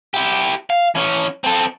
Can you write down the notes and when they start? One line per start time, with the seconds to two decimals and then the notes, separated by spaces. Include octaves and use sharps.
0.14 E4 G4
0.70 F5
0.95 E3 C#4
1.44 C4 A4